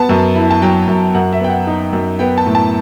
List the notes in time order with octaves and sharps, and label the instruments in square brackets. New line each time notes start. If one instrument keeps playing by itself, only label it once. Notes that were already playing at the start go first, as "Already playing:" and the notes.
Already playing: [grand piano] B3 A5
F#2
E4
A5
F#3 G5
F#2
F#2 F#5
E5
B3 G5
F#5
D#4
F#2
B3 G5
A5
A2
A5